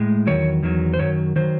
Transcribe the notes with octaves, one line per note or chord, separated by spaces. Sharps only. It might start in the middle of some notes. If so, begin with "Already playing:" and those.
Already playing: A2 G#3
E2 D#3 F#3 C#5
E2 D#3 F#3
C5
F#2 D#3 F#3 C#5
D#3 F#3 C5